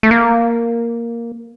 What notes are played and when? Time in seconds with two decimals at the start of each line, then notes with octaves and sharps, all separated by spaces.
0.03 A3
0.11 A#3